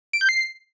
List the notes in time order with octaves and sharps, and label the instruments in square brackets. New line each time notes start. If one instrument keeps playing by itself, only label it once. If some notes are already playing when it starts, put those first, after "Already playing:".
[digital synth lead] D7
G6
C7